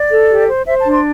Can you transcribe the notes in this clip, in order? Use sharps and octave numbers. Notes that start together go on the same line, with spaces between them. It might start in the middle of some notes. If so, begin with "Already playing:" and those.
Already playing: D5
A4
G4
C5
C5 E5
A5
D4
C6